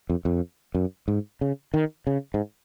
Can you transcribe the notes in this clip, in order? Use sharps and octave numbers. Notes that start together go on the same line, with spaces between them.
F2
F2
F#2
G#2
C#3
D#3
C#3
G#2